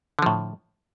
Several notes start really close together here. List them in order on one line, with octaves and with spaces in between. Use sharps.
D3 F3 A2